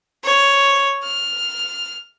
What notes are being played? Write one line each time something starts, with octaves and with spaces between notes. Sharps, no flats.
C#5
F6